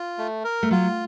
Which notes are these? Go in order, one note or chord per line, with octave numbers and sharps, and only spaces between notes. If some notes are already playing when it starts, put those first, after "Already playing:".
Already playing: F4
A3
A#4
A3
F#3 F4